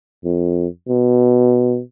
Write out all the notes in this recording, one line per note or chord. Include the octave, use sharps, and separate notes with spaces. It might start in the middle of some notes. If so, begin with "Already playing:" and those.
F2
B2